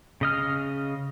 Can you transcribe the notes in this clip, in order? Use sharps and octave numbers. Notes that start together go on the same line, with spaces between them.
C#3 D#5 F6